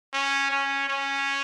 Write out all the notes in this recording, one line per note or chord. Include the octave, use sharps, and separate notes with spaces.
C#4
C#4
C#4